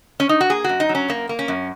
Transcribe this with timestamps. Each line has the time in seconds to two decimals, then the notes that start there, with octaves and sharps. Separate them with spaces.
0.20 C#4
0.29 D#4
0.41 F#4
0.50 A#3 G#4
0.64 F#2 F#4
0.80 D#4
0.89 F#3
0.95 C#4
1.08 F#2 A#3
1.29 A#3
1.39 C#4
1.48 F#2